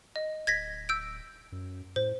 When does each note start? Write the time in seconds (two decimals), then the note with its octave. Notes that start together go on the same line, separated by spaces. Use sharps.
0.16 D#5
0.47 D1 G#6 A#6 B6
0.89 E6 G6 D7
1.52 F#2
1.96 A2 C5